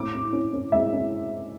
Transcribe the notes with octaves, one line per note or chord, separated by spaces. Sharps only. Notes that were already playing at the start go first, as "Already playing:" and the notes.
Already playing: A2 D6
E4
C#4
C#4
G#3 E5
C#4